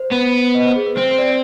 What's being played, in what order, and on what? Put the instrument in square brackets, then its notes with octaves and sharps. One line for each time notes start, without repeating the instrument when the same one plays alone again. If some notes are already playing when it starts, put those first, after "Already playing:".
Already playing: [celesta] C5
[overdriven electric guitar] B3
[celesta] D#5
C5
G#4
B4
[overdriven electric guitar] C4 [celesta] C5
[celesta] C5
D5